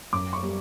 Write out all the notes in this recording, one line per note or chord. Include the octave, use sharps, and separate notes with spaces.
F#2 D6
C#6
G3